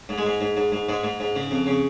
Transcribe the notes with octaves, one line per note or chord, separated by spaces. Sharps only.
G#2
G#3
G#2
G#2
G#2
G#2
G#2 G#3
G#2
G#2
C#3
F2
C#3